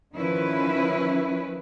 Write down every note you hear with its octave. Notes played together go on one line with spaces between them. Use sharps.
D#3 F3 C#4 E4 B4